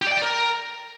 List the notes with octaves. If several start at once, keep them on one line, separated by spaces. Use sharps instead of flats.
G4
D5
G5
D5
A#4